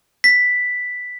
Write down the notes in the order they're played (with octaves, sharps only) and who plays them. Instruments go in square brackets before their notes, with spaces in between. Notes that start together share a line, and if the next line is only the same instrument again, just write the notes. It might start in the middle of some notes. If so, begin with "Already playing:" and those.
[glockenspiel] B6